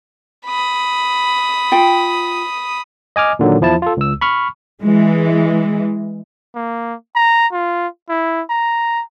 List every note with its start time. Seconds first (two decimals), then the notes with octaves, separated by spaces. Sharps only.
0.46 B5 D#6
1.72 F4 G5
3.16 D#5 G#5 D6 F6
3.39 A#2 D3 D#3 F#3
3.61 E2 F3 E4 A5
3.82 F4 A4
3.97 C#2 E6
4.21 B5 C#6 F6
4.80 E3 G#3
6.55 A#3
7.15 A#5
7.52 F4
8.09 E4
8.50 A#5